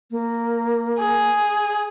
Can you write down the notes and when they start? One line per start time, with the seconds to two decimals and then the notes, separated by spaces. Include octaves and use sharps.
0.11 A#3
1.00 G#4